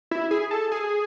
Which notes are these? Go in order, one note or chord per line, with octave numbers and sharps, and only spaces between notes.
E4
G#4
A4
G#4